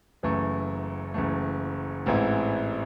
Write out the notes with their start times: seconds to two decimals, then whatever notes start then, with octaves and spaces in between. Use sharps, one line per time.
0.23 F#1 F#2 E3 A3
1.14 F#1 F#2 E3 A3
2.06 A1 G#2 E3 C4 E4